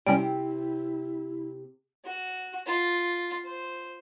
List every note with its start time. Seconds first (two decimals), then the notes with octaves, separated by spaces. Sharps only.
0.07 C3 G3 C4 C#4 E4 G5
2.04 F#4
2.66 F4
3.44 C5